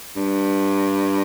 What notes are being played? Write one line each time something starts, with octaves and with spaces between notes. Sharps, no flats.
G2